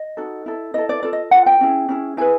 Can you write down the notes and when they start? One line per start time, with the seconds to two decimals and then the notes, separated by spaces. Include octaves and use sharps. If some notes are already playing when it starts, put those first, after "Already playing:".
Already playing: D#5
0.17 D#4 F#4 A4
0.46 E4 A4
0.74 E4 A4 D#5
0.89 D5
1.03 F4 A4 D5
1.13 D#5
1.31 F4 A4 F#5
1.46 G5
1.61 C#4 E4 G#4
1.89 C#4 E4 G#4
2.17 E4 G#4 B4 G#5